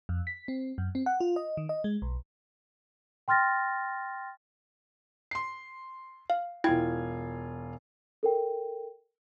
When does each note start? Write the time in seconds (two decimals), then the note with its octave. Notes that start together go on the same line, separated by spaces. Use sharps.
0.09 F2
0.27 B6
0.48 C4
0.78 F#2
0.95 C4
1.06 F#5
1.20 F4
1.36 D#5
1.57 D#3
1.69 D#5
1.84 G#3
2.02 B1
3.28 G5 C6 F6 A6 A#6
5.31 C6 C7
6.30 F5
6.64 E1 E4 F4 G5 G#6
8.23 A4 A#4 G5